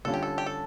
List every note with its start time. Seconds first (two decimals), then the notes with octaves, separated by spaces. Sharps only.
0.05 D3 G3 C#4 F4 A4
0.14 G4
0.23 A4
0.38 G4
0.46 A4